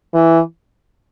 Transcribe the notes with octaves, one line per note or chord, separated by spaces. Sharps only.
E3